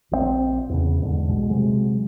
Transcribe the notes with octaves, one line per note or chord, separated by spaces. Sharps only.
A#1 E3 C4
E2 C#3
E2 G#2 D3
B1 B2 G#3
C3 F#3 G#3